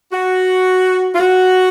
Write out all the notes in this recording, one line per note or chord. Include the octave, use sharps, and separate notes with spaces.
F#4
F4
F#4